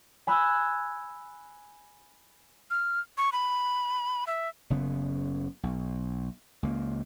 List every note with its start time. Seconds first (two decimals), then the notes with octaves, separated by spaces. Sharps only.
0.27 G#5 B5 E6 F#6
2.71 F6
3.18 C#6
3.32 B5
4.27 E5
4.70 F#1 C#3 B3
5.63 B1
6.63 C#2 A#3